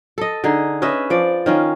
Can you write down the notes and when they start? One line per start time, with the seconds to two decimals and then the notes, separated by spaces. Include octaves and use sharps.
0.18 A4 D#5
0.44 D3 D#4 G#4
0.82 C#4 B4 D#5 E5
1.10 F3 D5
1.46 D#3 C#4 F4